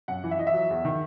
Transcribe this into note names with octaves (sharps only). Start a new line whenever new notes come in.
F#2 F#5
E3
E5
E3 D#5
E5
F#3
E2
D#3